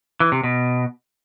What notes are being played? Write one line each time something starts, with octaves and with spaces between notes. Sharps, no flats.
E3
C3
B2